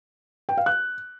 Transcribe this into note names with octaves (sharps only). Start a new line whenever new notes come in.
G5
F5
F#6